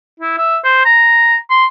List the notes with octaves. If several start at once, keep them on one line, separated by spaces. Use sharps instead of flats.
E4
E5
C5
A#5
C6